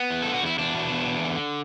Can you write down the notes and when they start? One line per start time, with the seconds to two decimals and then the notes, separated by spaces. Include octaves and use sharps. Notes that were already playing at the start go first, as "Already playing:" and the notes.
Already playing: B3
0.11 E2
0.22 D3 A4
0.34 F#4
0.42 E2 E4
0.59 E2 D4
0.75 B2
0.92 E2
1.08 E2
1.24 D3